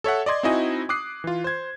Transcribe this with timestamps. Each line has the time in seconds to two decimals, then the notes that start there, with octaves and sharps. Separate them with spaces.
0.04 A4 C#5 E5 F#5
0.26 D5 D#5 C6 G#6
0.43 C4 D#4 E4 F#4 D#5 G#5
0.89 D6 D#6 F#6 C7
1.24 E3 F4
1.44 C5 G#6